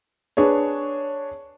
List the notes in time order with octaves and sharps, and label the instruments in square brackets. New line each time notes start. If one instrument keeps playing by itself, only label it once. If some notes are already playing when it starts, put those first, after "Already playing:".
[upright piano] D4 G#4 B4 C#5